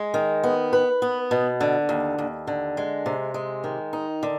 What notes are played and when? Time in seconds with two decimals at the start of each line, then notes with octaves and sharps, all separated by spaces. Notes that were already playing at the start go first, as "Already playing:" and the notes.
Already playing: G#3
0.14 D#3
0.43 B3
0.73 B4
1.02 B3
1.31 B2
1.61 D3
1.89 D#2
2.18 D#2
2.47 D3
2.77 G#3
3.06 C3
3.34 G#3
3.64 D#3
3.93 D#4
4.23 D3